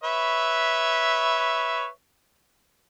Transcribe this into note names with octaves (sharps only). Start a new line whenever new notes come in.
B4 C#5 E5